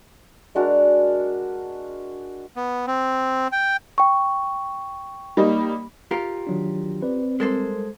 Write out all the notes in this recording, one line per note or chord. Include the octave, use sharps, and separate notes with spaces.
G#3 D4 F#4 A#4
B3
C4
G5
G5 C#6
G3 A#3 D#4
F4 G4 A#4
D#3 F#3 D4
C4 B4 D5
G3 G#3 A4 A#4 C5